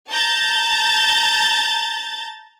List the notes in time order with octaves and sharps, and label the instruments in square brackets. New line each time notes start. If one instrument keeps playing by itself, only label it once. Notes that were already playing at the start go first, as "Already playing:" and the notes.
[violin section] A5 A#5 G6 A6